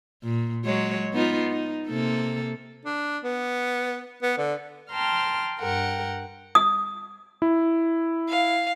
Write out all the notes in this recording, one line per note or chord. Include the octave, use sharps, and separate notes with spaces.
A#2
F#3 G#3 C#5
B3 D#4 F4
D#4
C3 A#3 A4
D4
B3
B3
D3
G5 A5 A#5 C6 F6
G2 A#4 F#5 G5
D#6
E4
F5